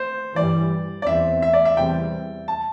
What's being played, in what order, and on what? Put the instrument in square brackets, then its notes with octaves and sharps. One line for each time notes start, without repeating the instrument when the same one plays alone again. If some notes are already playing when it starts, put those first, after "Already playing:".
Already playing: [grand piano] C5
[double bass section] G2 E3 G3 [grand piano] D5
[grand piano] D5
[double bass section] E2 E3 C4 [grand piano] E5
[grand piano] E5
D5
E5
[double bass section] E2 C3 G3 C4 [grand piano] G5
[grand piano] A5